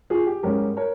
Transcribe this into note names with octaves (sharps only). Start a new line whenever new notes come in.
F4 G#4
G4
G#2 G3 C#4 G4 A#4
A#4 C#5